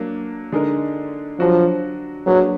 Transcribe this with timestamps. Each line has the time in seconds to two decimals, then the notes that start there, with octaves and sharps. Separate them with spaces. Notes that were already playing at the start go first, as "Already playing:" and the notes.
Already playing: F#3 A#3 D4
0.52 D3 G#3 D#4 A#4
1.39 F3 F#3 D4 F#4
2.26 F#3 A#3 D4 G#4 B4